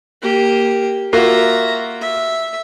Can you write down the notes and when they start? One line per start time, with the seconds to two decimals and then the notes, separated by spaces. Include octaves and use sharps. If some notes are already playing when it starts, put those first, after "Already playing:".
0.22 A#3 G4
1.13 A#3 F4 F#4 E5 A#5
2.01 E5